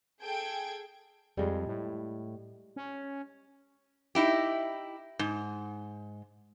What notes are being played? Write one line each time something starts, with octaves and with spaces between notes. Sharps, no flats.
G#4 A4 G5 G#6 D7
F2 G3 G#3
A2
C#4
D#4 E4 G4
G#2